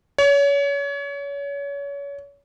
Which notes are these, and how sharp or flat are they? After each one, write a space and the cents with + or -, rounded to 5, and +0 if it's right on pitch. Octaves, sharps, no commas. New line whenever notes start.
C#5 +30